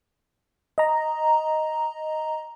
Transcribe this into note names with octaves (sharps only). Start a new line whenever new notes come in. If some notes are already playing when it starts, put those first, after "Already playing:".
D#5 A#5